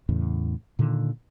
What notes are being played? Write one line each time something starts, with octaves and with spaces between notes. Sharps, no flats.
E2 A2 C#3
A#2 D3 D#3